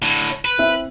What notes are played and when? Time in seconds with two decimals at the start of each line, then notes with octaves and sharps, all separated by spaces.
0.02 A2 D3
0.45 B4
0.58 C4 E4 E5